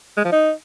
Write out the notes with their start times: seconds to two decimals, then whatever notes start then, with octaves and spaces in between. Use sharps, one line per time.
0.17 G#3
0.25 F3
0.32 D#4